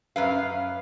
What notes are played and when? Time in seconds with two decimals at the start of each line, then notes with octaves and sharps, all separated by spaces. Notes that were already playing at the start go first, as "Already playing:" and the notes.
0.16 F#2 B4 F5